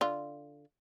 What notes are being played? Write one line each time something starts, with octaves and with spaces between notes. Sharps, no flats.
D3 F4